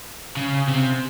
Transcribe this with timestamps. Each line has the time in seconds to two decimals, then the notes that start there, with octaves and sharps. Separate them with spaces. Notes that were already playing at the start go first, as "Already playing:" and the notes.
0.37 C#3
0.68 C3